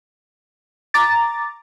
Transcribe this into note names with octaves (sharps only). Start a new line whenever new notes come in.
A#5 D6 A6